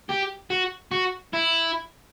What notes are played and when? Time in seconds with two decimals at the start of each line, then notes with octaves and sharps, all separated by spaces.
0.09 G4
0.50 F#4
0.92 F#4
1.33 E4